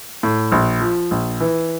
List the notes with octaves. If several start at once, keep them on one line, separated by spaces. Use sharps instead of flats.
A2
A#1
F3
A#1
E3